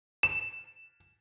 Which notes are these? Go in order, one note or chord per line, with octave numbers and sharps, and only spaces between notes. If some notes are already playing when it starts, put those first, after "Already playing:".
E7